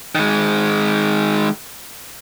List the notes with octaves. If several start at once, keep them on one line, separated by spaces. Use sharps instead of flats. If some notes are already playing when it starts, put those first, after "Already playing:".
D#3 G#3